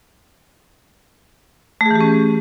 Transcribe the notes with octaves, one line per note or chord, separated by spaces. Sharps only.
E3 A3 C#4 G4 G#4